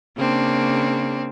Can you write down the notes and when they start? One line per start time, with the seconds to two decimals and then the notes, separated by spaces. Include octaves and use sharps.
0.16 C#3 A#3 C4 D4